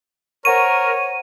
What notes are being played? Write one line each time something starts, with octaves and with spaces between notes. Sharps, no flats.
A#4 C5 C#5 F#5 C#6 D#7